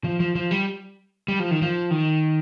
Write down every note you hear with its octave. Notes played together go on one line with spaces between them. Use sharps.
F3
F3
F3
G3
G3
F3
D#3
F3
D#3